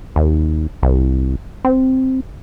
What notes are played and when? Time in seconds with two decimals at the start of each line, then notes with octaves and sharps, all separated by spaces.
0.16 D#2
0.83 C2
1.65 C4